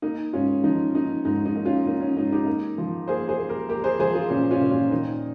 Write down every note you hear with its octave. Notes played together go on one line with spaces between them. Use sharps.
A#3 D#4
G#2 C#4 F4
F3 D#4
A#3 D#4
G#2 D#4
D#4
A#3
C#4 F4
A#3 D#4
C#4
G#2 D#4
D#4 G4
A#3
F3
A#3 G#4 C5
G#4 C5
A#3
G4 A#4
A#3 G4 A#4
G#4 C5
F3 G#4 C5
F4 G#4
A#2 C#4 F4
C#4 F4
A#2
C#4 F4
D#3 D#4